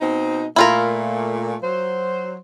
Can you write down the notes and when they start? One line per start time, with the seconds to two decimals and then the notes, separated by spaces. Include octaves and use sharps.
0.01 B2 C4 D#4
0.56 A#2 A3 E4 F4 A#4
1.62 F#3 C5